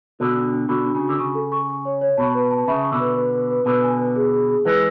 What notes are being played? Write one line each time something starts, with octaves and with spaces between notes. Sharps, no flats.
B2 D3 F#4
D4
D4
B2 D3 F#4
D4
C#3
F#4
D3
C#3 C#6
A4
C#6
C#6
C#5
C#5
B2 A5
B4
A5
C#3 E5
C#6
B2 D3
B4
B4
B4
B4
B2 D3 B4
G#5
B4
G#4
G#4
G#4
E3 G#3 B4